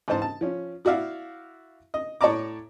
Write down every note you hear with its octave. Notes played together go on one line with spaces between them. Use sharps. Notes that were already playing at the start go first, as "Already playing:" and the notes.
G#2 E3 C5 A5
A5
F3 C#4
E4 F#4 D5 E5 F5
D#5
A2 C#5 D5 A5 A#5 D6